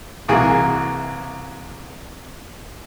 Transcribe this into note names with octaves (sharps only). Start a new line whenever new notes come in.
C2 E3 A#3 F#4 G#4 G#5